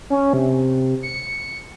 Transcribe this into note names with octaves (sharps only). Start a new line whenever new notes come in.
C#4
C3
C#7